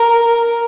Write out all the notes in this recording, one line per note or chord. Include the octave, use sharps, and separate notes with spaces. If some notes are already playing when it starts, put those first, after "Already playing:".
Already playing: A#4